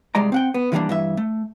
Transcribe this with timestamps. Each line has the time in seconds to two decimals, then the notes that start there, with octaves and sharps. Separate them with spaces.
0.15 C2 G3 G#3 D5 A#5
0.32 C4 F#5 G5
0.54 B3
0.72 D3 E3 G3 G#3 A#3 D4
0.89 G2 E3 E5
1.17 A3